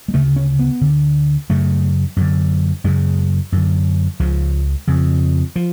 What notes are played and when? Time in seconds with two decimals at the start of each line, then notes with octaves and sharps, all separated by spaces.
0.08 G#3
0.14 D2 C#3 A3
0.36 C#4
0.59 B3
0.81 D2 D3
1.49 F#2 C#3 A3
2.17 F#2 D3
2.84 F#2 C#3 G#3
3.52 F#2 D3
4.19 C#2 C#3 F3
4.87 F2 C#3
5.56 F3